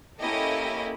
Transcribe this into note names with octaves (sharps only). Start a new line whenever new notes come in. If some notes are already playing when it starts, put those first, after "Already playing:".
A#3 C#4 E4 G4 A4 D#5